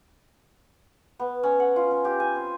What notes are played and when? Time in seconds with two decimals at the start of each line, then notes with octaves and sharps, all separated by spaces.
1.19 B3
1.43 C#4
1.60 F#5
1.76 F4
1.91 C#4
2.05 G4
2.20 G#5
2.35 C4